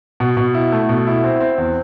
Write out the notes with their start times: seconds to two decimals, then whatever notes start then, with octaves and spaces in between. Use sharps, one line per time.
0.20 B2
0.37 B2
0.54 E4
0.72 A3
0.89 B2
1.07 E4
1.24 C4
1.40 C4
1.58 E2